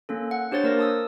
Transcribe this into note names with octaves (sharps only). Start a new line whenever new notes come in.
A#3 C#4 A4
F#5
D4 G4 C5 C#5 A6
A#3 A#4 D5 A#6
A5 D#6 E6